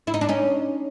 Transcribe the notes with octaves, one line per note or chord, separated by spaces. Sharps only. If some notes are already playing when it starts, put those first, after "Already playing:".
E4
D#4
D4
C#4 D#4